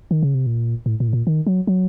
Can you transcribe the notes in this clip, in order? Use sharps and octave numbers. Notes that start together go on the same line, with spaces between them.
D#3
C#3
C3
A#2
A2
A#2
A2
A#2
D#3
F#3
F#3